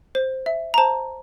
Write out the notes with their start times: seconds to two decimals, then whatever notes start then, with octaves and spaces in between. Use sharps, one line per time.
0.15 C5
0.46 E5
0.74 A#5
0.78 C5 A5